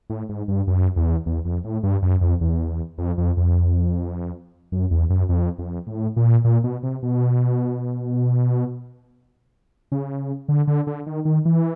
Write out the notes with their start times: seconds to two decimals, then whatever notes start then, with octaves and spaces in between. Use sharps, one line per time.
0.10 A2
0.29 G#2
0.48 G2
0.67 F#2
0.96 E2
1.26 E2
1.45 F2
1.64 A2
1.83 G2
2.02 F#2
2.21 F2
2.41 E2
2.98 F2
3.18 F2
3.37 F2
4.72 F#2
4.91 E2
5.10 F#2
5.29 F2
5.59 F2
5.87 A2
6.16 A#2
6.44 A#2
6.64 B2
6.83 C3
7.03 B2
9.92 C#3
10.48 D3
10.67 D3
10.87 D3
11.07 D#3
11.25 D#3
11.45 E3